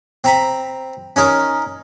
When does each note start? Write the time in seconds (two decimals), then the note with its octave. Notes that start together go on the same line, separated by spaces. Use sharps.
0.24 C4 A#5 B5
1.16 C#4 D#4 A#4